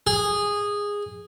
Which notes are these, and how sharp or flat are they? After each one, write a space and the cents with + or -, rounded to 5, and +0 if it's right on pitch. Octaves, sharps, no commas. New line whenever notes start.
G#4 -15